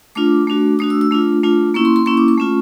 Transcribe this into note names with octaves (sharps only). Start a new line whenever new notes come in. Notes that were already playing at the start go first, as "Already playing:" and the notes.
A3 D4 F4 D6
A3 D4 F#4
A3 D4 F#4 D#6
E6
E6
A3 D4 F4
A3 D4 F4
A#3 C#4 E4 C#6
C6
C6
A#3 C#4 E4 C#6
D6
C#6
A3 C#4 F4